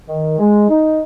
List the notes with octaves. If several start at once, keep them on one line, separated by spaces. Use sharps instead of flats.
D#3
G#3
D#4